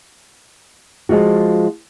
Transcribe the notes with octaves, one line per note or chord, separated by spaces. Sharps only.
F3 G#3 F4 F#4